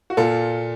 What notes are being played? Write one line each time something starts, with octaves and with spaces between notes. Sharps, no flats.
F#4
A#2 F4 A4